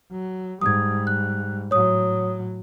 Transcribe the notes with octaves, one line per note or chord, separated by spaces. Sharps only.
F#3
G#2 G3 D#6 G#6
F#6
A2 F#3 C#5 D#6